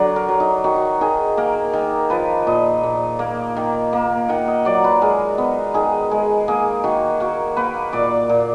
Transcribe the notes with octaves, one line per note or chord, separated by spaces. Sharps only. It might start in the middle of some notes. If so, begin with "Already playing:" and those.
Already playing: D3 F#3 D5
A#4
F#3
D#4
D#3 F#4
D#3 G#4
A#3 A#4
D#3
F3 B4
A#2 D#5
A#2
A#3
D#3
A#3
D#3 F#5
D#5
F#3 D5
B4
G#3 A#4
B3
D#3 G#4
G#3
A#3 G#4
D#3 F#4
A#3 F#4
A#3 B4
A#2 D5
A#2